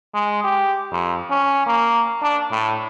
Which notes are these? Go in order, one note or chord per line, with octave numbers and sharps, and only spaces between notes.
G#3
G4
F2
C#4
A#3
D4
A2